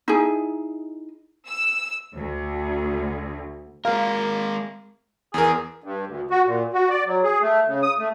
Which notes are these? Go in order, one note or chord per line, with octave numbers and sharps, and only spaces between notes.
D#4 E4 G#4
E6
D2
G#3 A#3 A#4 F5
E2 G#4 A#4
G2
D2
F#4
A#2
F#4
D5
F#3
G#4
A3
C#3
D#6
A3